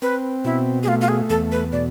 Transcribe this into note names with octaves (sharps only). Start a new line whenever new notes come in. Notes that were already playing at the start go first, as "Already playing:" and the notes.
C4 B4
B2 E4
G#4
A3 F4
F4
G#4
E2 A4
B4
B2 D5